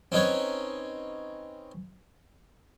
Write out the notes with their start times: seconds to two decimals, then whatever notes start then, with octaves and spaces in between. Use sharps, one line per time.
0.12 C4 C#4 D#4 B4 C#5